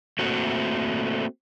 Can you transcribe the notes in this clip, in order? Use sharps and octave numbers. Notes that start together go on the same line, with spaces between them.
A3 A#3 C4 F#4 A4